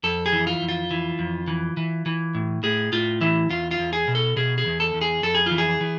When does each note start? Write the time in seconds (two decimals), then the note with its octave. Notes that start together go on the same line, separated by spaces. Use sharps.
0.03 F2 A4
0.26 G#4
0.33 E3
0.47 F4
0.61 F2
0.69 F4
0.91 E3
1.19 F2
1.47 E3
1.77 E3
2.06 E3
2.35 A2
2.63 A2 G#4
2.92 A2 F4
3.21 E3 E4
3.50 E2 F4
3.71 F4
3.79 E2
3.93 G#4
4.08 B2
4.15 A4
4.36 B2 G#4
4.58 G#4
4.66 E2
4.80 A4
4.94 E2
5.01 G#4
5.23 F2 A4
5.35 G#4
5.46 E3 F4
5.58 G#4
5.81 E3